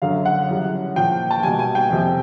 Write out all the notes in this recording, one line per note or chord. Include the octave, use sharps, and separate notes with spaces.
F#2 D3 F#3 F5
F#5
F#2 C#3 E3 G3
A#2 F3 G5
A5
B2 G3 G#5
G#5
G5
F2 C3 F3